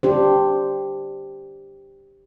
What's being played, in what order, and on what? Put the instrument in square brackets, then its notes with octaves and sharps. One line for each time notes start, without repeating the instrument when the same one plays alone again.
[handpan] D4 G4 C5